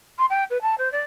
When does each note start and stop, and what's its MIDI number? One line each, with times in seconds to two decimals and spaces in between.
0.18 0.26 84
0.30 0.44 79
0.50 0.61 71
0.62 0.78 81
0.78 0.91 72
0.92 1.03 74